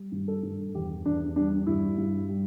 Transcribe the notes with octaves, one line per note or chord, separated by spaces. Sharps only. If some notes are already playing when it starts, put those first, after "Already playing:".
Already playing: G3
G2
A4
G2
E2 G4
E2 D4
G3 D4
G2 E4
G2
G3